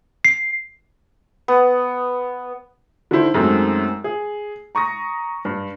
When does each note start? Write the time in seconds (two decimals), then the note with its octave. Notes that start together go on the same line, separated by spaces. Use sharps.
0.25 C7
1.48 B3
3.11 D3 D#3 E4 C5
3.34 F#2 D#3 G#3 A3 C4
4.04 G#4
4.75 A#5 C#6 D#6 A#6
5.45 G2